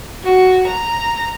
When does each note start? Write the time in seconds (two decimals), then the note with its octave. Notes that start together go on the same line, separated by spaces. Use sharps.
0.24 F#4
0.67 A#5